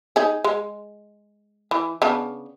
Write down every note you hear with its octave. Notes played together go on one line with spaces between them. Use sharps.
D#4 G#4
G#3
E3
C#3 B3 D4